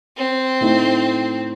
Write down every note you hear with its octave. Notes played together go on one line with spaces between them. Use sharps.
C4
A2 A3 D#4